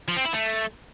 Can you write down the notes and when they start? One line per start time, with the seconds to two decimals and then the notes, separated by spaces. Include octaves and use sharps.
0.08 F3
0.17 C4
0.25 E4
0.34 A3